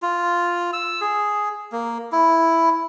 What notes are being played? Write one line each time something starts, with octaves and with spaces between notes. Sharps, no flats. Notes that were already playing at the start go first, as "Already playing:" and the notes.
F4
E6
G#4
A#3
E4